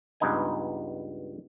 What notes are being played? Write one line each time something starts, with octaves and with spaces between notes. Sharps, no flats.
C#2 G2 B3 D#4 D#5 G#5